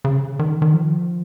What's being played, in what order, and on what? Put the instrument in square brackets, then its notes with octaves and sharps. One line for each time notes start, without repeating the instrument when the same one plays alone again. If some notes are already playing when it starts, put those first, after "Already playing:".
[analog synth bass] C#3
D#3
D#3
F3